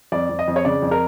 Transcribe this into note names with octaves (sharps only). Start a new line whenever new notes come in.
F2 D5
F2
D#5
F2
C#5
C#3 D5
F2
A#4